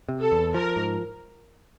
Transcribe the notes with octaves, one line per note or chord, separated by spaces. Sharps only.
C3
A4
E2
F3 A#4
G#2